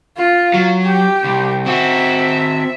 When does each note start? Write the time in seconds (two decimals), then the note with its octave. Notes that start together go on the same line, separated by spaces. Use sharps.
0.17 F4
0.54 F#3
0.85 G4 G5
1.24 C2
1.66 C4 F#4 E5